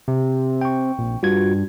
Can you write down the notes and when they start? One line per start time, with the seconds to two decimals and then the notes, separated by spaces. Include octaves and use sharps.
0.08 C3
0.61 G5 C#6
0.98 A#1
1.23 G2 F4 F#4 G#6